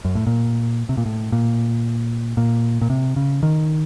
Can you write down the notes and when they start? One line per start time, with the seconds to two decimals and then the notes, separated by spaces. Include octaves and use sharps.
0.05 F#2
0.15 A2
0.27 A#2
0.89 C3
0.97 A#2
1.06 A2
1.32 A#2
2.37 A#2
2.81 A#2
2.90 C3
3.16 C#3
3.43 D#3